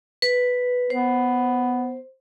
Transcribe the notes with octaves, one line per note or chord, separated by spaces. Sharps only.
B4
B3 C5